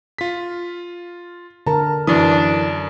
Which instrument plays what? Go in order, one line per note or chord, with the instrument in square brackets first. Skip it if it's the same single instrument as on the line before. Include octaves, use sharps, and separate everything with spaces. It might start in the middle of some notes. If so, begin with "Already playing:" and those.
[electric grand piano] F4 B6
[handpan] D3 A#4 [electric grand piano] A5 [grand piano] A#5
[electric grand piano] F#2 D#6 [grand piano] E3 [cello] D4